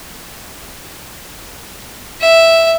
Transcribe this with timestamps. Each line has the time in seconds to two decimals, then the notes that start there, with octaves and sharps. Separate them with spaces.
2.21 E5